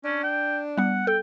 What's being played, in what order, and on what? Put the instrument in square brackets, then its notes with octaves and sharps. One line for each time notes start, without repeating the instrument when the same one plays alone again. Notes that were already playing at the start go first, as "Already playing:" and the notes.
[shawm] C#4 [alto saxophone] D4
[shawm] G5
[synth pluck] G3 B3 [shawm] F#5
[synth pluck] A4 [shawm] G5